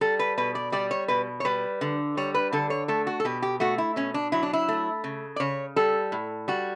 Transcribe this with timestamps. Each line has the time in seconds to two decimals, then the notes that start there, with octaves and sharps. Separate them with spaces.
0.01 G3 A4
0.19 B4
0.38 B2 B4
0.55 D5
0.72 G3 D5
0.91 C#5
1.08 B2 B4
1.40 C#5
1.45 G3 B4
1.81 D3
2.17 G3 C#5
2.34 B4
2.53 D3 A4
2.70 C#5
2.88 A3 A4
3.07 F#4
3.20 A4
3.25 B2 G4
3.42 G4
3.60 A3 F#4
3.78 E4
3.96 B2 C#4
4.14 D4
4.32 F#3 E4
4.43 D4
4.53 E4
4.69 A3
5.04 C#3
5.36 D5
5.40 C#3 C#5
5.76 G3 A4
6.12 A2
6.48 G3 F#4